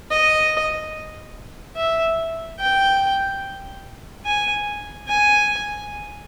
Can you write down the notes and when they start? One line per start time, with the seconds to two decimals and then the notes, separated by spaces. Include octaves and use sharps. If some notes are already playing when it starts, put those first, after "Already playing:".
0.11 D#5
1.76 E5
2.60 G5
4.25 G#5
5.08 G#5